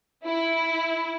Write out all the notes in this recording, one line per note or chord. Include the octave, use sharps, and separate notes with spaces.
E4